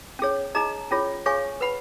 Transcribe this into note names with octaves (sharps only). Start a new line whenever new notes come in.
C#4 G#4 C#5
D#4 G#4 D#5 A#5
C#4 F4 G#4 C#5
G#4 C#5 F5 G#5 C#6
B4 F#5 B5